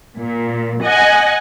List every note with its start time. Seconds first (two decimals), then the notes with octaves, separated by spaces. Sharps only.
0.19 A#2
0.84 D#5 F#5 G#5